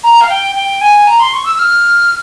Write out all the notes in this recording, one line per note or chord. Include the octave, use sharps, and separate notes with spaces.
A#5
F5
G5
G5
G#5
A#5
C6
C#6
E6
F6